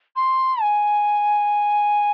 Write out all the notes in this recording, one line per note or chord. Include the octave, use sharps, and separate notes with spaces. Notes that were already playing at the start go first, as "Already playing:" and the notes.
C6
G#5